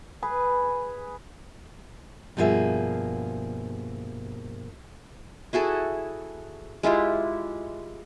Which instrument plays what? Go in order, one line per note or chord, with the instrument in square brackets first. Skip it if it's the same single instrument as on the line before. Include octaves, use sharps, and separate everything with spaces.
[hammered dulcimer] G#4 B4
[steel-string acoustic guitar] G2 B2 F3 A#3 G#4 E5
[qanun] E4 F#4 G#4 A4
G#3 E4 F4 G4